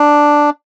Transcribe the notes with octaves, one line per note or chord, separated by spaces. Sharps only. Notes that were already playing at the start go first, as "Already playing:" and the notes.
Already playing: D4